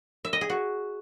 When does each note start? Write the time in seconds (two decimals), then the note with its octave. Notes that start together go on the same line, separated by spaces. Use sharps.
0.25 E5
0.33 D#5
0.41 G#4
0.50 F#4